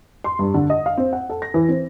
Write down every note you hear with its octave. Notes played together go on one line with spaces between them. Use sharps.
C6
G2
D3
D#5
F5
C4
F#5
A4
A#6
E3
C4